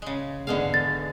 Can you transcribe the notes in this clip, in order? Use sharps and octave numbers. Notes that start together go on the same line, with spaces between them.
C#3 G#3
E2 G#2 D3 G#3 F5
A6